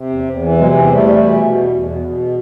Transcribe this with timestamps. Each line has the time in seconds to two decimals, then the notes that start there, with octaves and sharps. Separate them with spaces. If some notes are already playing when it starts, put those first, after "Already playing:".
Already playing: C3
0.10 E2
0.26 E2
0.42 E3
0.58 C3 F#3 G#3
0.75 E2
0.90 E2 G3 A3
1.06 E3
1.22 B2
1.38 B2
1.54 E2
1.70 E2
1.86 B2
2.02 B2